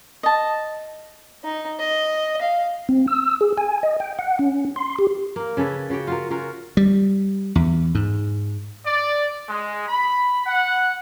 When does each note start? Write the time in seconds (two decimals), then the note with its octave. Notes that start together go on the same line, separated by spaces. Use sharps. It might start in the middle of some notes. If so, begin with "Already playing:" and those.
0.23 D#5 A5
1.44 D#4
1.80 D#5
2.42 F5
2.89 C4
3.07 E6
3.41 G#4
3.58 G#5
3.83 D#5
4.00 G5
4.19 F#5
4.39 C#4
4.76 C6
4.99 G4
5.36 A#3 A#4
5.57 C#3 C#4 A4 B4
5.90 C#3 F#4 G4 G5
6.07 F4 F#4 A#4
6.30 C#4 F4 F#4 A#4
6.77 G3
7.55 E2
7.95 G#2
8.85 D5
9.48 G#3
9.87 B5
10.46 F#5